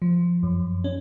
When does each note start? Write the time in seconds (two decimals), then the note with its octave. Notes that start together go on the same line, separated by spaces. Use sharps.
0.02 F3
0.43 F#2
0.84 C#4